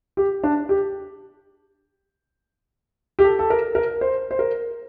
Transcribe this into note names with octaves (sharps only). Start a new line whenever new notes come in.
G4
D4
G4
G4
A4
A4
A#4
A#4
C5
C5
A#4